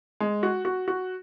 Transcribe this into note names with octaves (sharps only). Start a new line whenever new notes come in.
G#3
F#4
F#4
F#4